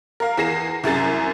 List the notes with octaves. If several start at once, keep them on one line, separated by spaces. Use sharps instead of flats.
A#4 F5
E2 G#4 A#6 C7 E7
C2 F#2 G#4 A6